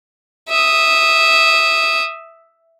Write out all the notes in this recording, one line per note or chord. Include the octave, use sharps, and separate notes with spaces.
E5 D#6